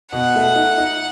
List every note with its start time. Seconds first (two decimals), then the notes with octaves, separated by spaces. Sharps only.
0.13 B2 F#5
0.35 A3
0.56 D#4
0.77 D#4